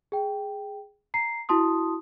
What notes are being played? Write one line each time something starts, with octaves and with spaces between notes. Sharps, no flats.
G#4 G5
A#5 C7
E4 F#4 A5 C6 D#6